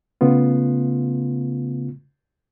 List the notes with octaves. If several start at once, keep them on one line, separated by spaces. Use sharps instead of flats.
C#3 A3 B3 F4